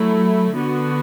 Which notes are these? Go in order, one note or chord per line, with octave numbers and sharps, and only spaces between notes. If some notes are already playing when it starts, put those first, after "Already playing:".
Already playing: F#3 A3 E4
D3 B3 F#4